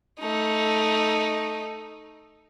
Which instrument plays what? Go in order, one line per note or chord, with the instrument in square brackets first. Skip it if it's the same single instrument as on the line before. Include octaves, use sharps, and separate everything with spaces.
[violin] A3 D#4